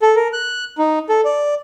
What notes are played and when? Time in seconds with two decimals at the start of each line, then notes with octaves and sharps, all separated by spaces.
0.02 A4
0.16 A#4
0.33 F#6
0.78 D#4
1.09 A4
1.25 D5